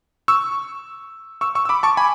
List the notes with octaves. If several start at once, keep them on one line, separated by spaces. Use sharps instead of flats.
C#6 E6
C#6 E6
C#6 E6
E6
B5 D6
A5 C#6
G#5 B5